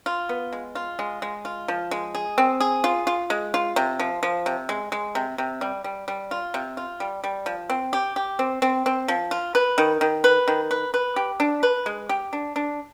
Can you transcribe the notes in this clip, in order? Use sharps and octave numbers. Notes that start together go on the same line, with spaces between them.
F4
B3
G#3
F4
G#3
G#3
F4
F3
G#3
G#4
C4
G#4
F4
F4
G#3
F4
C3
F3
F3
C3
G#3
G#3
C3
C3
G3
G3
G3
F4
C3
F4
G3
G3
F3
C4
G4
G4
C4
C4
C4
F3
F4
B4
D#3
D#3
B4
D#3
B4
B4
G4
D4
B4
G#3
G4
D4
D4